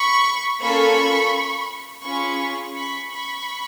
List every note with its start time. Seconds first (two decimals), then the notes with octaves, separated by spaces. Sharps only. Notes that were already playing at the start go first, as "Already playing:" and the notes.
Already playing: B5 C#6
0.61 A#3 C#4 F4 A4 B5 C#6
2.04 C#4 F4 G#4 B5 C#6
2.75 B5 C#6
3.11 B5 C#6